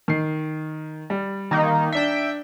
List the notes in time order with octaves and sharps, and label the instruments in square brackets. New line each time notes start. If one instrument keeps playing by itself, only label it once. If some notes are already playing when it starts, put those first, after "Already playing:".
[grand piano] D#3 C7
G3
[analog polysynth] D#3 A#3 D#4
[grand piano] D4 B6 [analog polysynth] E5 G5